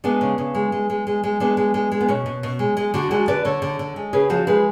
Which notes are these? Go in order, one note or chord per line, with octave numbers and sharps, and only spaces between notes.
G#3 B3 D4
C#3
C#3
G#3
G#3
G#3
G#3
G#3
G#3 B3 D4
G#3
G#3
G#3
B3
B2 C#4
B2
B2
G#3
G#3
D3 D4 F#4
G#3 F#4 A4
D3 B4 D5
D3 A4 C#5
D3
D3
G#3
C#3 G#4 B4
F3 F#4 A4
G#3 G#4 B4